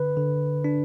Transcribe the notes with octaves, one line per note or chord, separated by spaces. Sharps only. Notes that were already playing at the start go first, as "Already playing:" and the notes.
Already playing: D3 B4
D3
D4